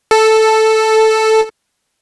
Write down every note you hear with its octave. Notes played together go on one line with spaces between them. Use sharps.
A4